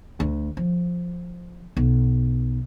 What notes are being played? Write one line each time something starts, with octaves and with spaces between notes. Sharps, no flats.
D2
F3
B1